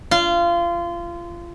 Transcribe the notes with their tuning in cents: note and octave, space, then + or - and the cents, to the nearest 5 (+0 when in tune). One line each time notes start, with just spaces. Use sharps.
F4 -25